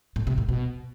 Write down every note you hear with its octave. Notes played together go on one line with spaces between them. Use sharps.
A2
C3
A2
B2